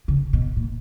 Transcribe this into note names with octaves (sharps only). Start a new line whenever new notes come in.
C#3
B2
A#2